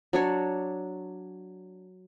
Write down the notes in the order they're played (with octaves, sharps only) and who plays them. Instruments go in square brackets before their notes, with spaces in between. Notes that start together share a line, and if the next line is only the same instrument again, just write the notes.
[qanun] F#3 D4 C#5